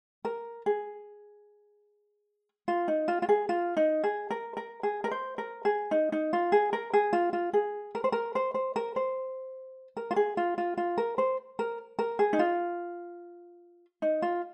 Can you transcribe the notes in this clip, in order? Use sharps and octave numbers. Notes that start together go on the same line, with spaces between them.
A#4
G#4
F4
D#4
F4
F4
G#4
F4
D#4
G#4
A#4
A#4
G#4
A#4
C5
A#4
G#4
D#4
D#4
F4
G#4
A#4
G#4
F4
F4
G#4
A#4
C5
A#4
C5
C5
A#4
C5
A#4
F4
G#4
F4
F4
F4
A#4
C5
A#4
A#4
G#4
D#4
F4
D#4
F4